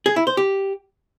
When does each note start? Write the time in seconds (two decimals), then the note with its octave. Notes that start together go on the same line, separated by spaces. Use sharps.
0.06 G#4
0.16 E4
0.27 C5
0.37 G4